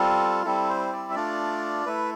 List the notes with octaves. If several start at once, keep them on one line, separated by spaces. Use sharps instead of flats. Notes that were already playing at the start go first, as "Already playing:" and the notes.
Already playing: G3 C4 F4 A4
G3 C4 E4 A4
C5
D5
E5
A3 D4 F4 D5
A3 E4 B4